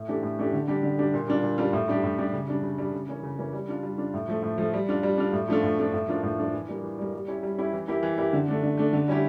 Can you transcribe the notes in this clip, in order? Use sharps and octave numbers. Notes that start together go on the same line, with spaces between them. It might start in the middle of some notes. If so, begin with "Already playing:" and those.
Already playing: A2
E3 A3 D4 G4
A2
E3 A3 D4 G4
D3
G3 D4 G4
D3
G3 D4 G4
A#2
G3 D4 F4
A#2
G3 D4 F4
A2
G3 D4 G4
A2
G3 D4 G4
C#3
G3 D4
C#3
G3 D4
C#3
E3 A#3 C#4
C#3
E3 A#3 C#4
G3
D4 F4
G3
D4 F4
A2
F3 A3
A2
F3 A3
G3
D4 F4
G3
D4 F4
A2
F3 A3 D4 F4
A2
F3 A3 D4 F4
A2
F3 A#3 D4 F4
A2
F3 A#3 D4 F4
E3
G3 A#3
E3
G3 A#3
G3
C#4 E4 G4
G3
C#4 E4 G4
E3
A#3 E4 G4
E3
A#3 E4 G4
D3
A3 D4
D3
A3 D4
D3
G3 C#4 E4 G4